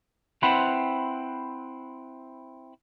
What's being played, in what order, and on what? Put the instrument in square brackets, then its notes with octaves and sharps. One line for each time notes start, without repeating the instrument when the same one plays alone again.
[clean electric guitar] C4 E4 B4 C5 F#5